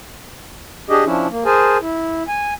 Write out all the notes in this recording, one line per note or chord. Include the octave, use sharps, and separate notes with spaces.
D4 G4 G#4 D#5
F3 C#4 D4 E4
A#3
G#4 A#4 C5 G#5 A5
E4
G#5